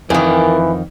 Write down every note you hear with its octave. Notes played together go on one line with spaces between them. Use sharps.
F2 D#3 E3 A#4 G5 G#5